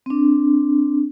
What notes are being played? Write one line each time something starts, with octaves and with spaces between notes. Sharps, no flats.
C4 D4